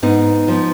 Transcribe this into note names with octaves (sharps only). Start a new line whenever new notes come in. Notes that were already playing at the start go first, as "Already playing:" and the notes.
G#2 B3 D#4
F3 B3